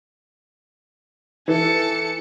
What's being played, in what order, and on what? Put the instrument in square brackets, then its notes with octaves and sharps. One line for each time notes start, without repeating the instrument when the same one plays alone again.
[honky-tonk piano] E3 [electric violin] A4 C#7